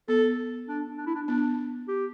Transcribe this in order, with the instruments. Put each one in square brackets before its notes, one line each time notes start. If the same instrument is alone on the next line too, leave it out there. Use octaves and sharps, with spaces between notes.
[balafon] B3 [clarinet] A4
[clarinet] D4
D4
E4
D4
[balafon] B3 [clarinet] D4
[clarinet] G4